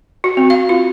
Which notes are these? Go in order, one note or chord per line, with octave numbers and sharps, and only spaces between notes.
F#4
C4
F5
F4